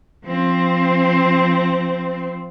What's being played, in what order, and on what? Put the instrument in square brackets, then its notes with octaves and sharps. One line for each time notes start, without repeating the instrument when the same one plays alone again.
[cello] F3 C4